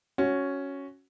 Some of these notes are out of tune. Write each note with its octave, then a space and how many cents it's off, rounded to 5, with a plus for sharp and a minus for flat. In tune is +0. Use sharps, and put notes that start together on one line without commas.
C#4 +0 F#4 +0